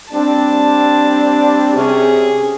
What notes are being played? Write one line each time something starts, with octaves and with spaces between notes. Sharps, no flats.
G3 C4 D4 A5
C3 C#4 G#4